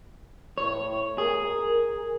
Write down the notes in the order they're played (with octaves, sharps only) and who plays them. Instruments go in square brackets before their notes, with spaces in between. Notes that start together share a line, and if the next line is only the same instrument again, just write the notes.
[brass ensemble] A2 [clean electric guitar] C#5
[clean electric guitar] G#4 [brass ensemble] A#4